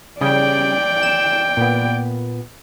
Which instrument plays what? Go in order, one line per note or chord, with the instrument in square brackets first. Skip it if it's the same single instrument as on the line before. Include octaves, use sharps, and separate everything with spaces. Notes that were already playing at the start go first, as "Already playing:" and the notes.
[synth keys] C#3 G3 G#4 [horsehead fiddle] D5 G5
[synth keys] E7
A#2 B3